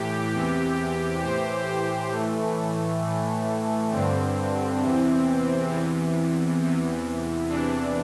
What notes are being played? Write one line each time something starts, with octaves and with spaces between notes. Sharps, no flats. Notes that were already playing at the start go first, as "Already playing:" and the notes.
Already playing: A2 E3 G4
E2 C3 E3
A2 E3 C5
C5
A2 E3 A3
A2 E3
G2 D3 C4
E2 C3 E3
E2 C3 E3
E2 C3 E3
E2 C3 E3 D4